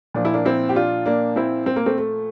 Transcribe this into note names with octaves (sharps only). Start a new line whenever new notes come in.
A#2 F3 D4
E4
A#3 D4
C4 E4
G4
D4 F4
A#3 D4
C4 E4
C4
A#3
A3 C4
A3